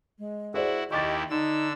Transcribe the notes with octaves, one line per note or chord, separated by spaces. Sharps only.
G#3
E4 F#4 G#4 C5 D5
D#2 E4 G4 D#5 C#6 D6 A6
D3 D#4 E6